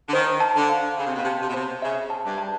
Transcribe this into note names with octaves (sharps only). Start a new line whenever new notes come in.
D3
D#3 C5
A5
D3
F5
C#3 F5
C3
B2
C3 A5
C3
B2
C3 C5
C#3 E5
A5
G2
A5